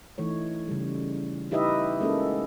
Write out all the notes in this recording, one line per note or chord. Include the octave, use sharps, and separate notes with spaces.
E3 A3 D#4 C#5
C#3 G3
D#4 E4 G4 B4 D#5 E5
G#3 A#3 C#4 A4